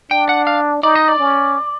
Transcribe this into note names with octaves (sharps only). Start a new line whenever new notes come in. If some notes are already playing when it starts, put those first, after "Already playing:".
D4 G5
F#5
F5
D#4 D5
D#5
D5
C#4